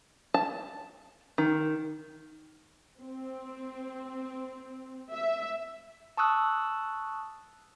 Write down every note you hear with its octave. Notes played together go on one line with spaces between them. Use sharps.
A5
D#3
C4
E5
A5 C#6 D#6 E6 F#6